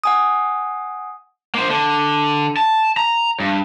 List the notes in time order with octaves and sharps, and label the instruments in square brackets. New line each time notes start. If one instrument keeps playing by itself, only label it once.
[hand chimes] F#5 G#5 D#6
[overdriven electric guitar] A#3 C5
D3
A5
A#5
G2